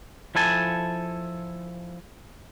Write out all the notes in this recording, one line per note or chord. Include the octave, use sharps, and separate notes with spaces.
F3 E4 A4 G#5 A5